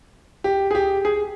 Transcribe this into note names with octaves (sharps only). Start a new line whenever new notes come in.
G4
G#4
G4
G#4